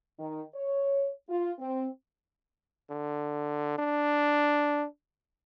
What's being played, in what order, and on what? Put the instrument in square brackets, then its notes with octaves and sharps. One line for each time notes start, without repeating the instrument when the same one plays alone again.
[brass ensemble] D#3
C#5
F4
C4
[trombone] D3
D4